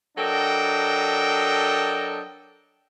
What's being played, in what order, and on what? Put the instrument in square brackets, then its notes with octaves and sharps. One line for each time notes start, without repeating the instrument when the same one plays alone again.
[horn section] F#3 D4 A4 A#4 D#5 G5